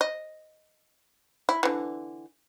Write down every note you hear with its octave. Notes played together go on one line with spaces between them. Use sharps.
D#5
E4
D3 E3